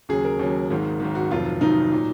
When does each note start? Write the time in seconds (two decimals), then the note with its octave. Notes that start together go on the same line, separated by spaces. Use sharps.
0.09 D#2 C#3 F#3 G#4
0.25 A#4
0.39 D#2 C#3 F#3
0.70 G#1 G#2 D#3
1.00 G#1 G#2 D#3
1.15 F#4
1.31 F1 F2 D#3 F#3 F4
1.61 F1 F2 D#3 F#3 D#4
1.92 A#2 F#3